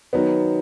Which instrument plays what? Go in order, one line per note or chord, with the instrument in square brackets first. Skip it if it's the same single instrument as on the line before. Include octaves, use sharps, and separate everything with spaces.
[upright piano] D#3 F#3 B3